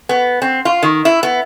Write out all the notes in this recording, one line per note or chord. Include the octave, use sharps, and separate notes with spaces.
B3
C4
F4
D#3
E4
B3